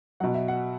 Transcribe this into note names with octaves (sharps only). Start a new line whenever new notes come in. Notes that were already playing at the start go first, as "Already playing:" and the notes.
B2 F#3 F#5
E5
F#5